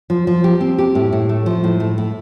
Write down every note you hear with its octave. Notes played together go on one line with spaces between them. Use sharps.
F3
F3
G4
C4
G4
A2
A2
A3
F3
A2
A3
A2